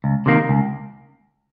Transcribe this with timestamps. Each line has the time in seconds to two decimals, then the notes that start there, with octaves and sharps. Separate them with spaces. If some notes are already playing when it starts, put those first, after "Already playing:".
0.04 C#2
0.26 C3 D#3 A#3
0.49 C#2